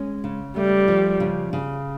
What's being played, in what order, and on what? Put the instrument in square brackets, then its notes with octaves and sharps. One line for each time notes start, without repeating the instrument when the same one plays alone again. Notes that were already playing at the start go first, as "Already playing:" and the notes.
Already playing: [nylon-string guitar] G#3 C#4
C#3
[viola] G3 [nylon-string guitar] A3
[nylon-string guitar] F3
C#3
C#3